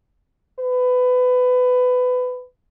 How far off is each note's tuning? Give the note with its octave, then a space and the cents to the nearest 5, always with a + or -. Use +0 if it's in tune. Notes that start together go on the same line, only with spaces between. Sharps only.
B4 +20